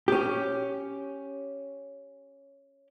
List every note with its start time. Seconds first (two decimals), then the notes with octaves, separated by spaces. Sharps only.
0.08 C#4 G4